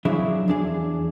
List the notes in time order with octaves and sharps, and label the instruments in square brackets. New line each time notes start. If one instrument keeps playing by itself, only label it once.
[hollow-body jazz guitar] F3 F#3 D4 E4 G#4 E5
E2 D4 G#4